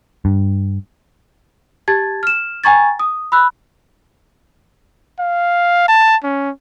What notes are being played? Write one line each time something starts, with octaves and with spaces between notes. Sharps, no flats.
G2
G4 A5 G#6 A6
F6 E7
G5 G#5 A#5 C#6 G#6 A6
D#6
B5 E6 F#6
F5
A5
C#4